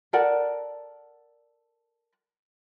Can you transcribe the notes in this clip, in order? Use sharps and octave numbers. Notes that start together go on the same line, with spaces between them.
A4 A#4 D5 F#5